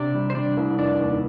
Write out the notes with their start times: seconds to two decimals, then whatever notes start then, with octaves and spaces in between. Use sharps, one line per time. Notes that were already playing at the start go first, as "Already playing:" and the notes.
Already playing: C3 D4 D5
0.14 G3
0.30 C5
0.35 G3 D4 D5
0.57 C2
0.78 F1 D4 D5
1.00 D#2